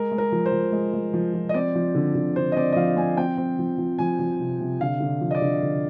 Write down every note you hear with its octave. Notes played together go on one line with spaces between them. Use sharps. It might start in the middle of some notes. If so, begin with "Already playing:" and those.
Already playing: G#3 A#4
G#3
A#4
F3
C5
F3
G#3
G#3
F3
F3
D#5
C4 D5
F3
D3
D3
D3 C5
D#5
C4 D5
D#5
F3 F5
C4 G#5
C4 G5
C4
F3
F3
F3 G#5
F3
C3
C3
D3 F5
D3
F3
D#5
D5
D3
D3